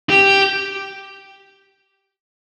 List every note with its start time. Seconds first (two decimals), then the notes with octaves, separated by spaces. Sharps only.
0.10 G4